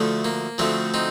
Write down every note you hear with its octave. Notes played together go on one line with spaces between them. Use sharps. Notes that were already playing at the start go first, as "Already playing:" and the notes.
Already playing: D2 D3 F3 A3
A#3
D2 D3 F3 A3 C4
C4 D#4